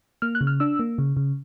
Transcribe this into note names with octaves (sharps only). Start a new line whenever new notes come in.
A#3 F6
F#6
C#3
F6
D4 E6
A#3
C#3
C#3